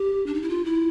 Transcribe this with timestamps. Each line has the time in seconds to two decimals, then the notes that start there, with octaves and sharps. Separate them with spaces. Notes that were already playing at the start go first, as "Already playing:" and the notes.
Already playing: G4
0.26 D4
0.34 D#4
0.42 E4
0.49 F4
0.65 E4